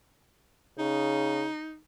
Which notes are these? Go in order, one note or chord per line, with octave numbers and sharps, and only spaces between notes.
C#3 D#4